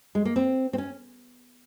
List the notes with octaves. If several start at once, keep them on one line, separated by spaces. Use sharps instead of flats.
G#3
A#3
C4
C4
C#4